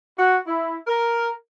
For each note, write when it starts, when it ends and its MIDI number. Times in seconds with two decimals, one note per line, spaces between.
0.18 0.37 66
0.47 0.76 64
0.87 1.29 70